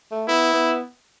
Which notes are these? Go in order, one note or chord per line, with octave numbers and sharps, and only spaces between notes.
A3
B3 E4
B3